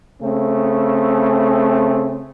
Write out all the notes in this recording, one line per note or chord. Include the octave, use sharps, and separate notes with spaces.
C#3 A3 C4